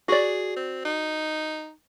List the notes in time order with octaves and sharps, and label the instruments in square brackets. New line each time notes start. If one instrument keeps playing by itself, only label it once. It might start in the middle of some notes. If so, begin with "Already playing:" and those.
[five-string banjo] F#4 D5 [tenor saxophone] G#4
[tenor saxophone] C4
D#4